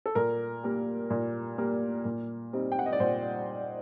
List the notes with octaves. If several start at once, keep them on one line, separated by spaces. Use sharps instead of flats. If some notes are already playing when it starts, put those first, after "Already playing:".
A4
A#2 A#4
G3 A#3
A#2
G3 A#3
A#2
G3 C4 D#4
G5
F#5
D#5
D5
A#2 C5